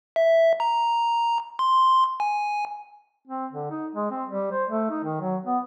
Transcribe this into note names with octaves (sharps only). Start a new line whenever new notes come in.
E5
A#5
C6
G#5
C4
D3
D#4
G#3
C4
G3
C5
A3
D#4
D#3
F#3
B3